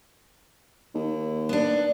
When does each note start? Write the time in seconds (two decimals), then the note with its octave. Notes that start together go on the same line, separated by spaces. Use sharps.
0.95 D#2
1.49 B3 D4